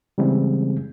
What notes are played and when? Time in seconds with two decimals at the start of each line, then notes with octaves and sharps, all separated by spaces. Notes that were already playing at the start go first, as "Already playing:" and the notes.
0.18 C#3 E3 G3 G#3 C4